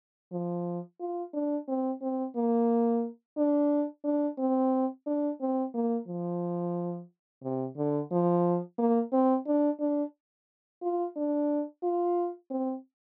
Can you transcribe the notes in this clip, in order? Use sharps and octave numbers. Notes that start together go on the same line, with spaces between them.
F3
F4
D4
C4
C4
A#3
D4
D4
C4
D4
C4
A#3
F3
C3
D3
F3
A#3
C4
D4
D4
F4
D4
F4
C4